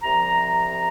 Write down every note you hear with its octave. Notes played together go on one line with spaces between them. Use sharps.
C2 C3 F3 A#5